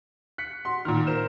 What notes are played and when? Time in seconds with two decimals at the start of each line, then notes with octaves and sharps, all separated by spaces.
0.38 F#6 B6 C#7
0.65 F#4 C6
0.85 A#2 D#3 F6
1.07 A#4 C5 E7